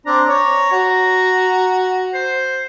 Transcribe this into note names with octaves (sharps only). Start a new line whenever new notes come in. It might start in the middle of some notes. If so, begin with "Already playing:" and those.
C4 D4 A#5
C#5
F#4
C5